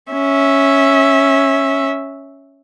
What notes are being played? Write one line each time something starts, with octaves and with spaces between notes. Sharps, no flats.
C#4 E5